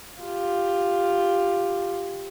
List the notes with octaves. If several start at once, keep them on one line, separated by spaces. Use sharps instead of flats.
F4 G4